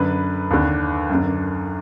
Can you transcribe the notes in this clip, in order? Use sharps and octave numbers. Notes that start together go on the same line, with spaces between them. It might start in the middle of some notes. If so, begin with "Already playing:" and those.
Already playing: F#2 D3 B4
D#2 D3
F#2 D3